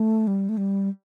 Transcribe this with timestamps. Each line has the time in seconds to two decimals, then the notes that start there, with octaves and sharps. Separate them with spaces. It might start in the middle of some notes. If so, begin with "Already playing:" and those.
Already playing: A3
0.27 G3
0.49 A3
0.57 G3